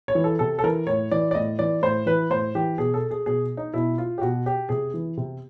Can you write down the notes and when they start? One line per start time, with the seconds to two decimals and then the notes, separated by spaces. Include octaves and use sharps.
0.08 C#5
0.15 E3
0.24 A4
0.39 C3 A4
0.59 A4
0.64 E3 A#4
0.87 A2 C#5
1.11 E3 D5
1.31 D5
1.35 A2 D#5
1.59 E3 D5
1.82 A2 C5
2.06 E3 B4
2.30 A2 C5
2.55 E3 G4
2.78 B2 G#4
2.94 A4
3.11 G#4
3.26 B2 G#4
3.57 D#4
3.74 B2 E4
3.98 F4
4.18 G4
4.21 B2 F#4
4.46 G4
4.69 C3 G#4
4.94 E3
5.17 C3